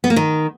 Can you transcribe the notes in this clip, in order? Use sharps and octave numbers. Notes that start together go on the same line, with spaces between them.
B3
A#3
D#3